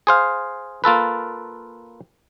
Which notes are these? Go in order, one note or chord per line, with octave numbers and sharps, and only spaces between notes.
G#4 C5 F5
A#3 F4 A4 B4